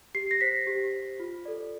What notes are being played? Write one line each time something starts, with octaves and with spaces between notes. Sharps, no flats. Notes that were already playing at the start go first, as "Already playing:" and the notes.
G4 C7
A#6
C5 B6
G4
C5
F4
A4 D5